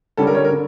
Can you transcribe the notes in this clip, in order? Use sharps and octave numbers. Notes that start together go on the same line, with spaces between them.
D3 G3 C#4 A4
A#4
C#5
A#4
D3